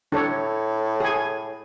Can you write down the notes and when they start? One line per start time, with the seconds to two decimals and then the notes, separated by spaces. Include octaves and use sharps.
0.12 A2 D4 A4 C#5
1.00 G#4 G#5